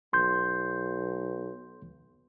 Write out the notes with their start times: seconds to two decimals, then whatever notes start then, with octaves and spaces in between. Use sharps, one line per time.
0.13 B1 C6 G6